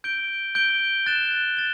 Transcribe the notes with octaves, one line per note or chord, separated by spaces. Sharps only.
G6 D7 G7
G6 D7 G7
F#6 A6 E7 G7
A6 E7 G7